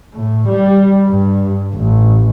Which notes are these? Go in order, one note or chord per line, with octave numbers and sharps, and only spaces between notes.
A2
G3
G2
A1